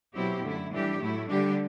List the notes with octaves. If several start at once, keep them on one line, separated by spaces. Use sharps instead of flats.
B2 F#3 C4 E4 G4
F#2 D3 A3 E4
A2 E3 G3 D4 G4
A2 F#3 A3 E4
D3 G3 D4 G4